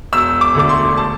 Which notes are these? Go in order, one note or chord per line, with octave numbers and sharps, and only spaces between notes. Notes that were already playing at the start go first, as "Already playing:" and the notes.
E1 E6
D6
D2 D3 D6
C6
A5